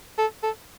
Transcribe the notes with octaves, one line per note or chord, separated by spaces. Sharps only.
A4
A4